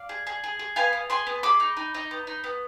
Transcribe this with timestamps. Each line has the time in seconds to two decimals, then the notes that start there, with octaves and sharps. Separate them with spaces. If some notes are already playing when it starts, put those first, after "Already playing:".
Already playing: D5 F5
0.09 G#4
0.27 G#4
0.44 G#4
0.59 G#4
0.76 B3 F5 G#5
0.93 B3
1.10 G#4 G#5 C6
1.27 B3
1.43 G#4 B5 D6
1.60 D#4
1.77 D#4
1.94 D#4
2.11 B3
2.27 D#4
2.44 B3